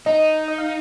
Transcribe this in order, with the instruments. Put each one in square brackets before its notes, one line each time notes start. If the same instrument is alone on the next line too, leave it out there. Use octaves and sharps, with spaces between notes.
[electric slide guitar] D#4 [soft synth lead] D#5
[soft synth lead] D#5
F5